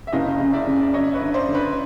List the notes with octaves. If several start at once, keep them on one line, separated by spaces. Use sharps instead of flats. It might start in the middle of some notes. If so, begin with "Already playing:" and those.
E5
F#1 D#5 F5
C#3
D5 E5
C#3
D5
F#2 C#5 D#5
B4 C#5
D3
C5 D5
D3
B4 C#5